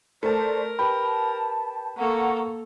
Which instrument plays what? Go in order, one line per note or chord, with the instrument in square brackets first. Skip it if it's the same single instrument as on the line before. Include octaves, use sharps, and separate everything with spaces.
[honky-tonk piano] A3 A5 [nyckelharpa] A#4 [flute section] C5 D5
[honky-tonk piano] G4 [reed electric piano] B4 B5 [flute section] A5
[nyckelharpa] A#3 A4 [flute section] F#5 A#5 C#6